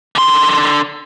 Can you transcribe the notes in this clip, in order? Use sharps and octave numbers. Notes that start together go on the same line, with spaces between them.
D3 C6